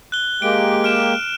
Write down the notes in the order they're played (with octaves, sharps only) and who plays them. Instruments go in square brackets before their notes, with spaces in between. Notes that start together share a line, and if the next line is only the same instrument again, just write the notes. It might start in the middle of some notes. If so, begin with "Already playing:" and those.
[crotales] F#6 G7
[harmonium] G#3 A#3 G4 [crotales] D7
[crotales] F6 D7 E7